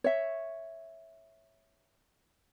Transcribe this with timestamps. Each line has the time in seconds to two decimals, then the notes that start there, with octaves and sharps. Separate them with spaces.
0.04 C#5 E5